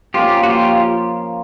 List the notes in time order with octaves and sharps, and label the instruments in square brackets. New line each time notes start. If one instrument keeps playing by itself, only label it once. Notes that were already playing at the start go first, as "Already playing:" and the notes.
[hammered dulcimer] F3 A#3 C#4 [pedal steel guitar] F4 G4
[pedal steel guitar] F#4
F4 G4